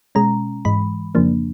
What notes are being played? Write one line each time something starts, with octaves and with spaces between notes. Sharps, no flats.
B2 G#3 C#4 A#5
G#2 E3 G#3 B5
F2 C#3 F3 A#3 D4